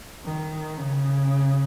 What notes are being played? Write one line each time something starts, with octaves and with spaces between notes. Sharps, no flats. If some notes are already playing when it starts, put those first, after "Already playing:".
D#3
C#3